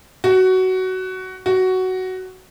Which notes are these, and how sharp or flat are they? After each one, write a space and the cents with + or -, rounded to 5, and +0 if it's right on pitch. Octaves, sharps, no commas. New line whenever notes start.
F#4 +15
F#4 +10